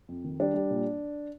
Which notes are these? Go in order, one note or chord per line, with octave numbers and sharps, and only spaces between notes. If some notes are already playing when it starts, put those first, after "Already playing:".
F2
D#3
G3 D4
G3
A#2